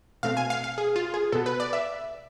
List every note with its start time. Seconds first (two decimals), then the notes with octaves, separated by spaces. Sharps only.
0.23 B2 A3 C4 F5
0.37 G#5
0.50 F5
0.64 F5
0.78 G#4
0.96 F4
1.14 G#4
1.32 B2 B3 A4
1.46 B4
1.60 D5
1.73 E5